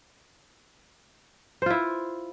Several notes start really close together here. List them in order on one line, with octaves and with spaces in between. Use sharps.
C5 F4 E4